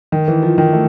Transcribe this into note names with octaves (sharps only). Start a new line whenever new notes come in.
D#3
E3
F3
D#3
A3